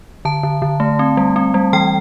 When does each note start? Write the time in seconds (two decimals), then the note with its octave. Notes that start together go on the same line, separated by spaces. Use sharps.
0.25 D3 A5
0.43 D3
0.62 D3
0.80 A3
0.99 C4
1.17 G3
1.36 C4
1.54 G3
1.73 E3 G5